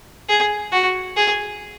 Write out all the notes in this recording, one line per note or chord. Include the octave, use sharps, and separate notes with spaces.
G#4
F#4
G#4